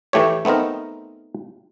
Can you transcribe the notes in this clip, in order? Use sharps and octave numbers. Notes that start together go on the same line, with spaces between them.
A2 E3 A3 G4 C#5
A3 B3 C4 D#4 A#4